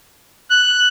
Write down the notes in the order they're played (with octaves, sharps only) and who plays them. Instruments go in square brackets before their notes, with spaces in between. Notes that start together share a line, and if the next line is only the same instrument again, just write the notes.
[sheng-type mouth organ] F#6